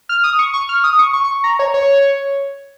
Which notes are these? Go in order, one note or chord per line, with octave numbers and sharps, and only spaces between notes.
F6
D#6
C#6
C#6
F6
D#6
C#6
C#6
C#6
A#5
C#5
C#5